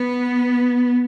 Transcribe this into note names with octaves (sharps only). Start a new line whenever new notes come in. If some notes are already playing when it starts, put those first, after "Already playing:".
Already playing: B3